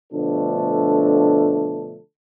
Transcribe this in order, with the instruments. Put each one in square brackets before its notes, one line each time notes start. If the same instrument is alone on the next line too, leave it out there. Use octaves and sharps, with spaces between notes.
[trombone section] B2 D3 F3 A3 D4 A4